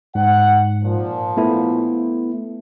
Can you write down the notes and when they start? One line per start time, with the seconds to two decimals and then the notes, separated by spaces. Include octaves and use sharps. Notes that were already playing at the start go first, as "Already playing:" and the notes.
0.15 G#2 F#5
0.82 A#2 F3
1.37 A3 B3 E4